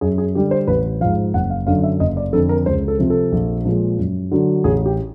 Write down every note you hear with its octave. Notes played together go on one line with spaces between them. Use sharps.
F#2 G#4
G#4
D3 G3 G4
C5
A1 B4
G#2 F3 F5
F#1 F#5
F5
F#2 D3 F5
E5
F#1 D#5
D5
F2 D3 A4
A#4
C#2 C5
A4
C3 F3
A4
A#1
A#2 F3 G#3
F#2
D3 F#3
A1 G#4
G4